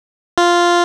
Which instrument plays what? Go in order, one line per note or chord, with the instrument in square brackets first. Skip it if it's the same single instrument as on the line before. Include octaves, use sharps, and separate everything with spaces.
[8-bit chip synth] F4